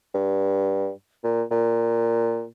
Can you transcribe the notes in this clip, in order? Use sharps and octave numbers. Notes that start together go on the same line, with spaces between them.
G2
A#2
A#2